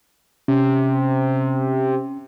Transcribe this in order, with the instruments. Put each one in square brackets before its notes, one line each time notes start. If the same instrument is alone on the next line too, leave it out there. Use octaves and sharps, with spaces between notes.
[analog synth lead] C3 [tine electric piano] C#4